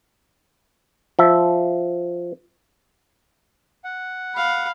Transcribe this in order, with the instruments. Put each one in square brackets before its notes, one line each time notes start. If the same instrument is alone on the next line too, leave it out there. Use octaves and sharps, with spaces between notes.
[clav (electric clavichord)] F3 E5
[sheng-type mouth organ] F#5
[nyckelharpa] F5 B5